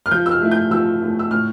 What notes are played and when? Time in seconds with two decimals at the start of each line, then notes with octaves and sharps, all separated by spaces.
0.06 F6
0.11 F3 G6
0.26 E6
0.31 F6
0.41 A3 E4
0.51 G6
0.71 F3 E6
1.01 A3 E4
1.19 E6
1.31 A2 F6